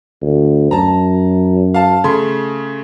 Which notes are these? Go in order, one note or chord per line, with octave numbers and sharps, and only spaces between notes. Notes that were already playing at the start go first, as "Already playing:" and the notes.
D2
F#2 A5 A#5
F5 A5
C#3 A3 C6